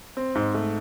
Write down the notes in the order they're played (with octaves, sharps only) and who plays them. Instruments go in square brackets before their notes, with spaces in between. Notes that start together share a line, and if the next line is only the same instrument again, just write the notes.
[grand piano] C4
G#2
A3